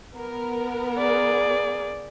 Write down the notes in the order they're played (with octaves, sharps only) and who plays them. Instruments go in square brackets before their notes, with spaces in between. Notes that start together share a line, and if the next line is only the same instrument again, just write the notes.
[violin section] B3 A#4
[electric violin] G#4 D5